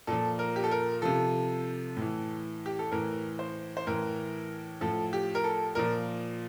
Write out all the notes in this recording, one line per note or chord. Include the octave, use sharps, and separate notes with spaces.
A#2 F3 A4
A#4
G4
A4
A#4
C3 F3 A4
A2 E3
G4
A4
A2 E3 A#4
C5
C5
A2 E3 A#4
A2 F3 A4
G4
A#4
A4
A#2 F3 A#4